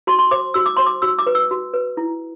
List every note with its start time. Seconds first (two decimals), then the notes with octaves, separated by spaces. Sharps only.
0.07 F#4 C6
0.19 C6
0.31 C5 D6
0.54 F#4 E6
0.66 D6
0.77 C5 C6
0.86 D6
1.02 F#4 E6
1.18 D6
1.26 B4
1.35 E6
1.51 F#4
1.74 B4
1.97 E4